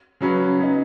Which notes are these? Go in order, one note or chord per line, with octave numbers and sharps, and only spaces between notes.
C#3 F#3 C#4 B4
C#3 B3 D#4